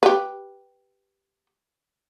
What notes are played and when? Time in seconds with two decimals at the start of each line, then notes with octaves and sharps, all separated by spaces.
0.03 G4 B4